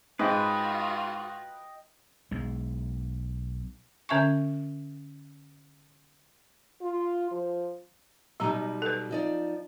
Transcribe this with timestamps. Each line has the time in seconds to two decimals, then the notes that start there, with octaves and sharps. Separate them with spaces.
0.19 G#2 F4 F#4 B4 D#5 G5
2.31 B1 G#3
4.09 D3 C#4 E5 G#5 C#6
6.81 F4
7.31 F3
8.40 B2 F#3 G3 D#4 A#5
8.82 A4 B4
9.11 F3 D#4 D5